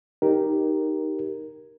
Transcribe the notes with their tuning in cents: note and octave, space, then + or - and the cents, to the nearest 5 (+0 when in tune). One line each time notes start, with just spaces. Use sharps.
D#4 +0 G4 -5 A#4 +0